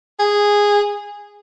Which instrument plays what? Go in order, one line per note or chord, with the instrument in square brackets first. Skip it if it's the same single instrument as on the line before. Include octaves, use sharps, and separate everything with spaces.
[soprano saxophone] G#4